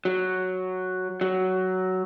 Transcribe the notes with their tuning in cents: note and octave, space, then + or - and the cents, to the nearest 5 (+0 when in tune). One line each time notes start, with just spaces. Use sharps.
F#3 +0
F#3 +10